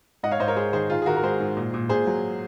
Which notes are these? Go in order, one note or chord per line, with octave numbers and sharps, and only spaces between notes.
G#2 D#5 F#5
C#5 F5
G#2 C5 D#5
A#4 C#5
G#2 G#4 C5
D#3 G#4 C5
D#3 F4 G#4
G#4
D#3 F#4 A#4
A#4
G#2 G#4 C5
G#2
A#2
A#2
A#2 G#4 C5
F#3